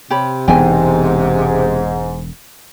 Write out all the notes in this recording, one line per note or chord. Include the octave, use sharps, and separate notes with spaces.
C3 G4 C#5 B5
E1 G#2 E3 B3 G5 G#5